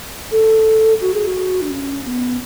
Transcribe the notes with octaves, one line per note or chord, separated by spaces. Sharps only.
A4
F#4
G#4
F#4
D4
C#4
B3